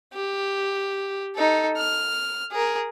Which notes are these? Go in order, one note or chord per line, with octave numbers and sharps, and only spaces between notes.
G4
D#4 A4
F6
G#4 A#4